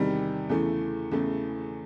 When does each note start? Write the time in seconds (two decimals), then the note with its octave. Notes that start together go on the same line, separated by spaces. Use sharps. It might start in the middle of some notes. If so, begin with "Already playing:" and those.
Already playing: E2 C3 D#3 G3
0.49 E2 C#3 E3 A3
1.11 E2 C#3 E3 A3